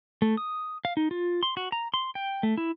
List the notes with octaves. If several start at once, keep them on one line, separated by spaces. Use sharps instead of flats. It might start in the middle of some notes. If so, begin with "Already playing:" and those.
A3
D#6
F5
D#4
F4
C6
F#4
A#5
C6
G5
A3
E4